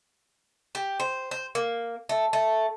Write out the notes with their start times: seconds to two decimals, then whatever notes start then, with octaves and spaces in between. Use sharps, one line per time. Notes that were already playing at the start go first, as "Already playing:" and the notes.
0.75 G4
1.00 C5
1.31 C5
1.55 A#3
2.09 A3
2.33 A3